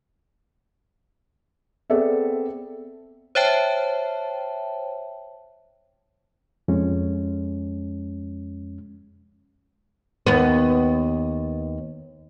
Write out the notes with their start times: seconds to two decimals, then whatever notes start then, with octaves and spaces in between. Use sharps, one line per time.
1.90 B3 C4 G#4 A4 D5 E5
3.35 C5 C#5 E5 G5 A5
6.68 F2 G#3 C#4
10.27 D#2 B3